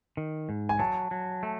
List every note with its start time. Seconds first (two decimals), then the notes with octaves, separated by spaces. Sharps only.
0.17 D#3
0.49 G#2
0.69 G#5
0.79 F#3 A5
1.11 F#3
1.43 A3